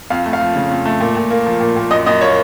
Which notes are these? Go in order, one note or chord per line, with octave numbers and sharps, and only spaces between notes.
F2 F5
A3
F5
F3
C#3
F2
A3
A#2
A#2
A#3
F3
A#2
A#2
F#2 D#5
F#2 D#5
A#3 C#5